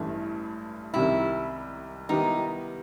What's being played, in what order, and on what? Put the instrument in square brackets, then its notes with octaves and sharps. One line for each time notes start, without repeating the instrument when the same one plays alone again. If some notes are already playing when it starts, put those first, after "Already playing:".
Already playing: [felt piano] A1 G2 E3 A3 E4
[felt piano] C2 C3 D#3 G3 [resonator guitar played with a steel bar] E4
[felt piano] D#3 G3 B3 E4 G4 [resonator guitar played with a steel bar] D#4